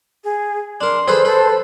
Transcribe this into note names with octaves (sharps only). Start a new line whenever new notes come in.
G#4
D4 A#4 C6
G#4 A4 B4 C5
A4 B4